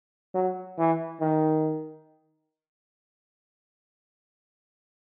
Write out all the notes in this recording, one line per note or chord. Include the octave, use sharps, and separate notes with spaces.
F#3
E3
D#3